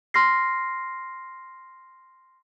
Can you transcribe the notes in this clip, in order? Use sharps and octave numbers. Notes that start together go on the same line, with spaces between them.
C6 F6 A#6 C7